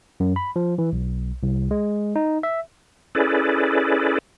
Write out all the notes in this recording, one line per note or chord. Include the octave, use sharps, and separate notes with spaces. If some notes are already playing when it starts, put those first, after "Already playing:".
F#2
B5
F3
E3
B1
C2
G#3
D#4
E5
C#4 E4 G#4 A4 B4 D5